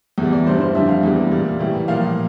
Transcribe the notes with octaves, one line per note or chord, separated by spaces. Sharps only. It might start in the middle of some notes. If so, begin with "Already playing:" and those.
E2 E3 G3
D5
G2 E3 G3 C5
C5
F2 D3 G3 E5
F5
E2 E3 G3
A#2 G3
A2 E3 G3
A#2 F3 F5